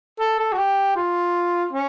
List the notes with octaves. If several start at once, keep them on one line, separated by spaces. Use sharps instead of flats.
A4
A4
F#4
G4
F4
C#4